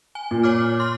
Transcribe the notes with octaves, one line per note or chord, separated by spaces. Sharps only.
G#5
A#2
C#5 D6 F6
C6 F6